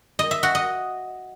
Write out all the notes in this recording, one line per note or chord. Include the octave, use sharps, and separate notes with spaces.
D#5
E5
F#4
D#5